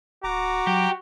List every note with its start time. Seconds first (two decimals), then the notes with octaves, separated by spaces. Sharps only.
0.24 D1 F#4 A#5 D6
0.67 F#3 G4